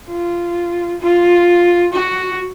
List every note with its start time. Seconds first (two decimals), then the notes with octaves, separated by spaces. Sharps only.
0.09 F4
1.01 F4
1.93 F#4